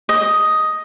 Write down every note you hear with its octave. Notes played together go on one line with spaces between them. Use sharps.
D#5